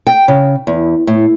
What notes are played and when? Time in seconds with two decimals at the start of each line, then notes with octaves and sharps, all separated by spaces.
0.07 G5
0.28 C#3
0.67 E2
1.07 A2